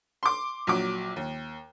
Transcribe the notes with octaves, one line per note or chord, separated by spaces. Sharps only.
C6 D6
A#1 F#3 D6
D#2